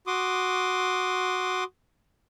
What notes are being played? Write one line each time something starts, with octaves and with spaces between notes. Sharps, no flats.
F#4 C6 D6 D#6